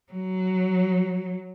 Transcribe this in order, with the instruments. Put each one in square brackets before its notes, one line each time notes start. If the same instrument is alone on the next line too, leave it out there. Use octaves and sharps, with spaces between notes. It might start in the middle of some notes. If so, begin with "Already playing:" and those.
[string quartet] F#3